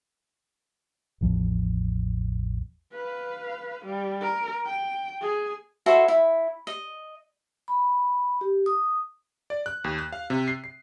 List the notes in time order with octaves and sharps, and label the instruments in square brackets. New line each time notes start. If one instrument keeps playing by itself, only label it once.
[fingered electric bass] A1 E2 F3
[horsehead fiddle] B4 F5
G3
A#4
G5
G#4
[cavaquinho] E4 F#4 A4 C5
E4
D#5
[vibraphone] B5
G4
D#6
[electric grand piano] D5
F#6
D#2
F#6
F5
C3
C7
C7